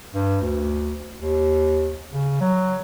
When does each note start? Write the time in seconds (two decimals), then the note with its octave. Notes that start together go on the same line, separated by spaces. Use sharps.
0.14 G2
0.41 D2
1.20 D#2
2.12 C#3
2.41 F#3